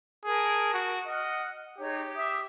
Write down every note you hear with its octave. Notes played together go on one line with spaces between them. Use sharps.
G#4 A#4 A5
F#4
D#5 F#5 F6 F#6
D#4 G4 G#4 C#5
E5 D6 D#6